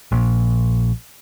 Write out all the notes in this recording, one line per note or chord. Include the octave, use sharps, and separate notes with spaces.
A#1